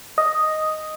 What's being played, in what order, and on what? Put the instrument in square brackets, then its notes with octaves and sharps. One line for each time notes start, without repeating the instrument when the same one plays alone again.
[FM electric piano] D#5